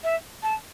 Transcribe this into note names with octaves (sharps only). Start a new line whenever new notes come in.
E5
A5